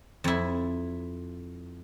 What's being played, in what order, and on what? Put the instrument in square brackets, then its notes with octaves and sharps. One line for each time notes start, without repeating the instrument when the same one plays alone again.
[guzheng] F2 E4